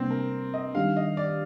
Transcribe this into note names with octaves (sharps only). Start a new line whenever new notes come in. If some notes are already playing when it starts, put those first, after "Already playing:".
Already playing: C3 G3 A#3 C4 D4
A#4
D#5
D#3 G3 D4 G4 F5
D#5
D5